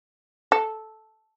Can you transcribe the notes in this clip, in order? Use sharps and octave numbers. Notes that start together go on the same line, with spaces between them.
A4